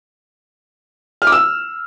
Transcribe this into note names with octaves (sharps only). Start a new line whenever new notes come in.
F6
D6
E6